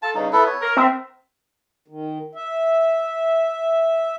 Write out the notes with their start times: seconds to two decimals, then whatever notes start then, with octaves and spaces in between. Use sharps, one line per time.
0.02 F4 A4 A5
0.15 G2 C#3 D#4
0.33 B3 E4 A4
0.47 C#5
0.61 A#4
0.77 C4 A#4 E5
1.88 D#3
2.35 E5